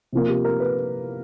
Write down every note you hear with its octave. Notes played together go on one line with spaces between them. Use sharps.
C3 F3 A#3
G4
A#4
B4